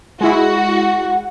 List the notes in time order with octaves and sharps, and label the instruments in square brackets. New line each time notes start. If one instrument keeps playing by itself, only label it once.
[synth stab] G#3 E4 [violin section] F#4
[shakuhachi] F#5